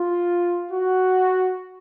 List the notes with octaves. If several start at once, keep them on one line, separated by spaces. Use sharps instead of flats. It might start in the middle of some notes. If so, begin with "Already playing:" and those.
Already playing: F4
F#4